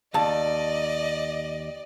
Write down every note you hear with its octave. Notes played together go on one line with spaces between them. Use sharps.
D#2 D5 D#5 A5